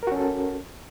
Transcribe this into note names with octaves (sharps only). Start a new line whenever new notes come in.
C#4 F#4 A4 A#4